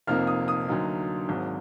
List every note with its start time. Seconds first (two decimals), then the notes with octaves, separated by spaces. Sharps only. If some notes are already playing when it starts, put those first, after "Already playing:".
0.07 F1 F2 F3 A#3 D#4 F6
0.27 D#6
0.48 D#6
0.68 D2 D3 F#3 A#3 D#4
1.28 G#1 G#2 F#3